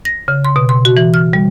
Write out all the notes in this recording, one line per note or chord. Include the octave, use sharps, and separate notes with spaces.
A#6
C#3
C6
B2
C6
F#4
E3
F6
G3